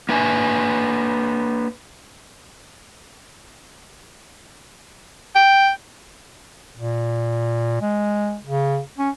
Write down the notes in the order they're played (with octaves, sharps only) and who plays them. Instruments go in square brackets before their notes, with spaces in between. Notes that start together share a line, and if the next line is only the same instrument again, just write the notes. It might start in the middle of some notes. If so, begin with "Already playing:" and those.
[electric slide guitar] A#3 D4 B4 E5 G5 G#5
[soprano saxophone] G5
[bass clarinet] A#2
G#3
C#3
C#4